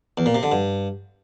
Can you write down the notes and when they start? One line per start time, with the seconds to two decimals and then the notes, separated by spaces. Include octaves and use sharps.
0.18 E2
0.26 A#2
0.35 C3
0.43 D3
0.52 G2